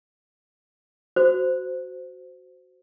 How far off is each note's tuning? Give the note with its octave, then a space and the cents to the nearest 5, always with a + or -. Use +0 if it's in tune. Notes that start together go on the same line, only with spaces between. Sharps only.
F#4 +0 C5 -20